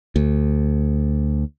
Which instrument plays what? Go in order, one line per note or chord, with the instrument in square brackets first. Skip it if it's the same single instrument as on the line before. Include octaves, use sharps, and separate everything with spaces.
[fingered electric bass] D2